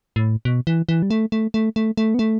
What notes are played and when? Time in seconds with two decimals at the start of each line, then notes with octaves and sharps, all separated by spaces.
0.16 A2
0.45 B2
0.67 E3
0.89 E3
1.02 G3
1.11 A3
1.32 A3
1.54 A3
1.76 A3
1.97 A3
2.14 B3
2.19 A3